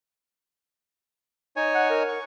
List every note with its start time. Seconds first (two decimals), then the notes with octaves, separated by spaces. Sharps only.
1.56 D#4 C#5 G#5
1.75 F#5
1.90 A#4
2.08 C#6